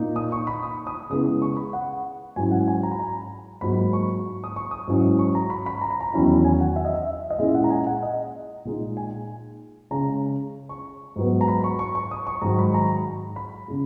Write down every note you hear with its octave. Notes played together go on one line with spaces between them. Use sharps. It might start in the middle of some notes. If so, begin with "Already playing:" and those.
Already playing: A#2 A#3 D#4
D#6
C#6
B5
D#6
D#6
C#3 G#3 B3 E4 D#6
C#6
B5
F#5
G#2 F#3 C#4 E4 G#5
F#5
G#5
A#5
B5
A#5
G#2 F#3 A#3 B5
C#6
D#6
C#6
D#6
G#2 F#3 C#4 E4
C#6
A#5
B5
B5
A#5
B5
A#5
E2 D#3 F#3 C#4 E4
G#5
F#5
E5
D#5
E5
D#5
A#2 G#3 C#4 E4 E5
F#5
A#5
G#5
F#5
D#5
A#2 G#3 D#4
G#5
C#3 G#3 C#4 A#5
C#6
G#2 F#3 B3
A#5
B5
C#6
C#6
C#6
D#6
C#6
G#2 D#3 F#3 A#5
B5
A#5
B5
C#3 G#3